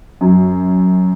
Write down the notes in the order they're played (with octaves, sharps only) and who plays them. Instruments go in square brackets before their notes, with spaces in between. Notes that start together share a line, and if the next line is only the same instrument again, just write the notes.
[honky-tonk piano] F#2